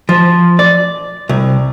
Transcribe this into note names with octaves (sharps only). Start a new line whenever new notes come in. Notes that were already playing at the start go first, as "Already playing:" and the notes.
F3
D5
C2